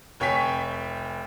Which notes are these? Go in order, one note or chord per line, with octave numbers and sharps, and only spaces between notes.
F1 C#5 G5 G#5 B6